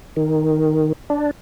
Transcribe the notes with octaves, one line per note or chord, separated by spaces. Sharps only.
D#3
D4